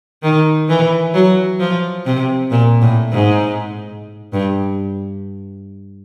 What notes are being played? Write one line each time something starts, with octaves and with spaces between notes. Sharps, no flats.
D#3
E3
F#3
F3
C3
A#2
A2
G#2
G2